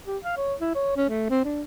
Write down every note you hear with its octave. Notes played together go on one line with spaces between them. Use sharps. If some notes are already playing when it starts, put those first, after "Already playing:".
G4
F5
C#5
E4
C#5
C#4
A3
C4
D4